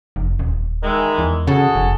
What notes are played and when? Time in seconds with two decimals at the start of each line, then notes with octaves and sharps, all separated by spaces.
0.16 F1
0.39 D#1
0.82 D#3 E3 G#3
1.19 E2
1.47 C#3 F#4 G#4 A4
1.75 F1